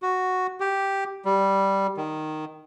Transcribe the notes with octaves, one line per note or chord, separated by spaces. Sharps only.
F#4
G4
G3
D#3